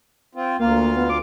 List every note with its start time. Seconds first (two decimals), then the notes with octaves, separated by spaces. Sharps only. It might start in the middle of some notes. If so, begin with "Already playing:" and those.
0.35 C4 F4
0.59 D2 A#3 F4 F5
0.97 B3
1.10 D6